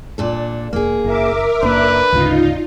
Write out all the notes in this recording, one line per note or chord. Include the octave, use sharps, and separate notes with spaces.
A#2 D4 A4
E1 A#3 G#4
F#1 A#4 E5 D6
F#1 A#3 D4 B4
D2 G#2 C#3 D#4 F4